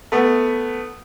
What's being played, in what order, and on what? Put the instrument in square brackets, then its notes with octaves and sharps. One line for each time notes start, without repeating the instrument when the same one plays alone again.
[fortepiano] A3 B3